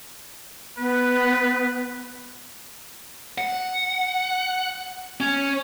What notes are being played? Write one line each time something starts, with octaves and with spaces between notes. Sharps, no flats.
B3 B4
F#5
C#4